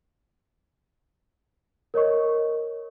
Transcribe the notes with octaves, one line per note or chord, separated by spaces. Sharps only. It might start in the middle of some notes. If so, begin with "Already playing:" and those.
A#4 C#5 D#5 C#6